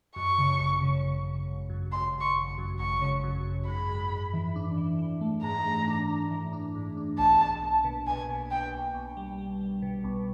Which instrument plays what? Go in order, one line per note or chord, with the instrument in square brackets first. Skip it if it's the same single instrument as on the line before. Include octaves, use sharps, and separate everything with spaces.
[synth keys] F#2 [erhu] C#6
[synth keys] C#3
G#1
C#3
G#1
G#1
G#1
F#2
[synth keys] G#1 [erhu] C6
[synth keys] G#1
[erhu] C#6
[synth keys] G#1
F#2
[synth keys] G#1 [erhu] C#6
[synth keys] C#3
F#2
F#2
[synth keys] G#2 [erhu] B5
[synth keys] G#2
G#2
E3
D4
E3
E3
A3
[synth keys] G#2 [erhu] A#5
[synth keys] A3
D4
D4
E3
D4
G#2
D4
[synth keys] B1 [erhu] A5
[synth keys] B1
A#3
B2
[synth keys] B1 [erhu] G#5
[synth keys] B2
[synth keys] B2 [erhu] G5
[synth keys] B1
B1
G3
G3
G3
B2
B1